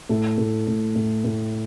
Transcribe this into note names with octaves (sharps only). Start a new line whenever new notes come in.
A2 A4
A2
A2
A2
A2